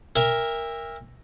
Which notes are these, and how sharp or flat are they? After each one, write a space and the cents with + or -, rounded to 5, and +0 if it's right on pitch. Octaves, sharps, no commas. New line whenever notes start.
A#4 +0 E5 +0 G5 +45